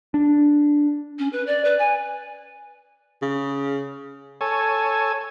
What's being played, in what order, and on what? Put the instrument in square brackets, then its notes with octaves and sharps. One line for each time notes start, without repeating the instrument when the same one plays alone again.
[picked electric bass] D4
[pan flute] C#4
B4
D5
B4
G#5
[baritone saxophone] C#3
[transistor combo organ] A4 C#5 G#5